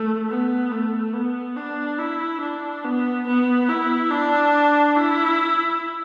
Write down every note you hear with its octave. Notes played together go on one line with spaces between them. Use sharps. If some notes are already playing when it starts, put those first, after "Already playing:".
Already playing: A3
B3
A3
B3
D4
E4
D4
B3
B3
E4
D4
E4